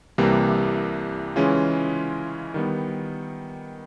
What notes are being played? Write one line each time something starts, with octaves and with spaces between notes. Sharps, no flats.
C2 C3 E3 G3 A#3
C#3 E3 G#3 C#4 F4
D#3 G3 B3